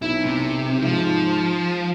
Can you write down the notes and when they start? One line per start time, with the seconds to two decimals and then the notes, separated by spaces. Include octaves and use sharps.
0.02 B1 E4
0.24 C3
0.82 G#2 F3